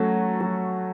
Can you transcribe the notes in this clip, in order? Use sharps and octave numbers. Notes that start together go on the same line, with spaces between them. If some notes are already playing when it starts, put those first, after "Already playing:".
Already playing: F#3 A3 C#4 F#4 A4
F#3